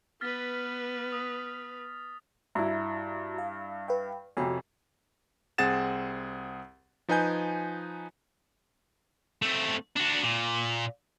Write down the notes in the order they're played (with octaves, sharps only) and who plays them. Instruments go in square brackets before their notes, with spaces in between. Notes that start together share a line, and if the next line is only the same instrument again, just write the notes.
[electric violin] B3 B4 [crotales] F6 A6 B6
[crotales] D#6
[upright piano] G2 E4 [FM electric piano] F#4 E5 A#5
[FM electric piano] F5
B4 F5 G5
[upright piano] F2 C3 [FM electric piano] F#4 C#5 G#5
[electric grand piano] C2 C4 G#4 F#5 A6 E7
F3 D#4 B4 G#5 G6
[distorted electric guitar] A3 C4
D4 F#4
A#2